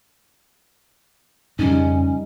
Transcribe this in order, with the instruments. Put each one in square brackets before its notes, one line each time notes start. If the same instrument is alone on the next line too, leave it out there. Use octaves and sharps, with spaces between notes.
[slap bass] F2 C#3 [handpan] G3 D#4 [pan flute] C#4